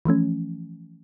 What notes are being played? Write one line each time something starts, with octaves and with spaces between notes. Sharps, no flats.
E3 F3 A3 C#4